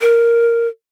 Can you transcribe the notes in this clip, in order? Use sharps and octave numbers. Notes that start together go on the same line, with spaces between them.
A#4